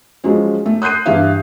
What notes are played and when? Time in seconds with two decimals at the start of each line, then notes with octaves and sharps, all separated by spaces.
0.24 F3 F#3 G#3 C#4
0.66 A3
0.82 D#6 F#6 G6 C7 D#7
1.06 G2 E3 E4 G4 F5